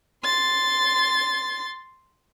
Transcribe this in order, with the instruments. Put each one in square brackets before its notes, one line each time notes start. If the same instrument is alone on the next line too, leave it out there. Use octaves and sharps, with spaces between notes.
[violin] C6 A6